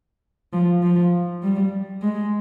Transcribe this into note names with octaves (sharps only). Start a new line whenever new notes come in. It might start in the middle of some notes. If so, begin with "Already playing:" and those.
F3
F3
G3
G#3